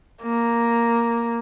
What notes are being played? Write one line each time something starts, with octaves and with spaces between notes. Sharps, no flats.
A#3